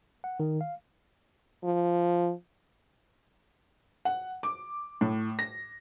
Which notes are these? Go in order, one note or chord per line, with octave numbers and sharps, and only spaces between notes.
F#5
D#3
F5
F3
F#5
D6
A2
A#6